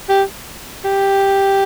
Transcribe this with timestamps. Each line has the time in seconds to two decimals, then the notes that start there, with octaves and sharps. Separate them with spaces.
0.09 G4
0.84 G4